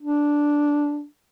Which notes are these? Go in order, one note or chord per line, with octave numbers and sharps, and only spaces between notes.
D4